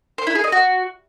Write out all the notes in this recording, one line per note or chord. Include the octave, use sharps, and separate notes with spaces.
C5
E4
G#4
D#5
F#4